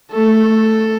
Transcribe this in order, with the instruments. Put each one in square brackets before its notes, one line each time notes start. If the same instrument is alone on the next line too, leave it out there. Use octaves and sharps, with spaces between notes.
[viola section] A3 [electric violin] A4